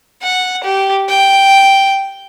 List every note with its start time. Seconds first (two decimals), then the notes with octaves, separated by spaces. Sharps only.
0.22 F#5
0.63 G4
1.09 G5